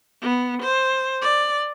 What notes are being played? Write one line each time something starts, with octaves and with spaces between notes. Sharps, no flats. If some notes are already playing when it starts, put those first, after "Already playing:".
B3
C5
D5